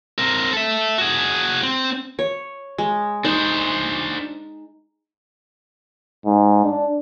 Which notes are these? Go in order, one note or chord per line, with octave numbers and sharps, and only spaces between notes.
C4 A#4
A4 E5
F#4 G#4
C4
C#5
G#3
D4 D#4 C5
G#2
D4